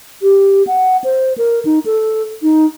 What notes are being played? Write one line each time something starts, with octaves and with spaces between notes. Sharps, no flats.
G4
F#5
C5
A#4
D#4
A4
D#4